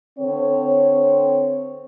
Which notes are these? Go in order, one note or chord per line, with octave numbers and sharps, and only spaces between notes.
D3 C4 A4 C#5